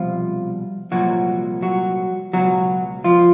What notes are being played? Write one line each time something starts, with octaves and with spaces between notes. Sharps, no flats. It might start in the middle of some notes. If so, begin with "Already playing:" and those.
Already playing: C2 B2 F3 F4
C2 A#2 F3 F#3 F#4
F#3 F#4
C#2 B2 F#3 F#4
F3 F4